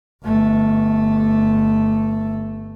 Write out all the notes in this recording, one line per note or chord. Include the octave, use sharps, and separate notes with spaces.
G1 A3